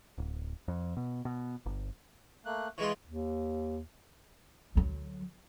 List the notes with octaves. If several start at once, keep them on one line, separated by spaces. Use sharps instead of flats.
D1
F2
B2
B2
G1
A3 A#3 F#6
E3 G#3 F4 C#6
D#2
D2 F#3